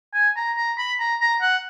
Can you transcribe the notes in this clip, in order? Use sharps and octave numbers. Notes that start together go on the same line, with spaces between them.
G#5
A#5
A#5
B5
A#5
A#5
F#5